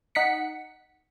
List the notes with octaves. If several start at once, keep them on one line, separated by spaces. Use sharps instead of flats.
D#4 F#5 B6 C#7